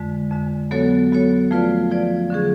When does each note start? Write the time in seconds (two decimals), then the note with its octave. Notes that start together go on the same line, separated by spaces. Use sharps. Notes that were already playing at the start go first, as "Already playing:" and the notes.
Already playing: F2 D3 G#3
0.32 F2 D3 G#3
0.71 F#3 B3 F#4 A4 C#5
1.12 F#3 B3 F#4 A4 C#5
1.51 F3 A3 F4 B4 D5
1.91 F3 A3 F4 B4 D5
2.30 D3 F#3 C#4 G#4